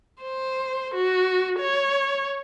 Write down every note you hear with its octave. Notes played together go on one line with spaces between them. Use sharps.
C5
F#4
C#5